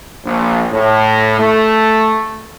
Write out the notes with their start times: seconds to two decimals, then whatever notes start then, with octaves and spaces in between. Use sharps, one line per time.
0.24 A#1
0.71 A2
1.38 A3